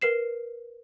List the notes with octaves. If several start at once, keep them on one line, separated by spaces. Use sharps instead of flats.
A#4 B4 C7 E7